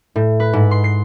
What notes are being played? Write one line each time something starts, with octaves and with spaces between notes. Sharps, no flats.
A2
B4
G#2
C6
C7